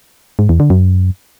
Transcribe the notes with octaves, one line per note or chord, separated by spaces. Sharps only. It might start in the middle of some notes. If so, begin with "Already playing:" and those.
G#2
E2
D3
F#2